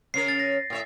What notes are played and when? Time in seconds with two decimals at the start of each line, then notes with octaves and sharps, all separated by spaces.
0.14 C#3 C#4 A#4 C7
0.28 A6
0.40 A#6
0.70 A2 C#5 E5